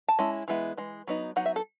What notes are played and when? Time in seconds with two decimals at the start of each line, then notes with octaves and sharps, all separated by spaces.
0.08 A5
0.19 G#3 C#4 E4
0.48 E3 G#3 B3 E4
0.77 E3 G#3
1.07 F#3 B3 D#4
1.36 F#3 B3 D#4 F#5
1.46 E5
1.56 A4